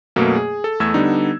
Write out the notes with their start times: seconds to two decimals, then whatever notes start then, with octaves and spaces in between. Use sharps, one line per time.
0.16 F#2 B2 A3 A#3
0.35 G#4
0.64 A4
0.80 E2 A3 E6 G#6
0.94 D3 G3 B3 D4 D#4